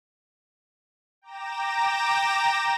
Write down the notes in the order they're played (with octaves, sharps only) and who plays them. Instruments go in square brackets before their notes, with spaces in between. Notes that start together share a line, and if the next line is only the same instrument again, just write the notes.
[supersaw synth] G5 A#5 D6 A#6 E7